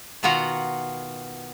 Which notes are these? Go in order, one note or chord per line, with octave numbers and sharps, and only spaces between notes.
B2 D#3 B3 F4 F#4 A#5